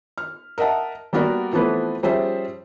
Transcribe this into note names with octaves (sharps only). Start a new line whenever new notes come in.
F6
A#4 D#5 E5 F#5 A5
G3 A#3 B3 F#4 A#4 D5
E3 F3 A3 B3 C4 B4
F3 G3 C#4 G#4 C5 E5